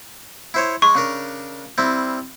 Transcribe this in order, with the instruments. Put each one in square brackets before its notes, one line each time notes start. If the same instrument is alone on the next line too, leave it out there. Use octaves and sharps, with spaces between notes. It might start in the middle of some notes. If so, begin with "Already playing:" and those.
[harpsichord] E4 C5 C#5
[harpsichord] G#3 [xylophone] C#6
[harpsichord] C#3 D4 A#4
G3 C4 E4